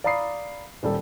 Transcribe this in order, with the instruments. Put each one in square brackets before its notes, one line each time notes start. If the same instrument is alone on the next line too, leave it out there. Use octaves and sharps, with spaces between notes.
[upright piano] D5 F5 A#5 B5 D#6 C7
D#1 G3 A4